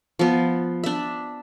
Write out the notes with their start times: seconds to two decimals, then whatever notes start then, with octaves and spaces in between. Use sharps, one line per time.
0.19 F3 B3
0.84 D4 E5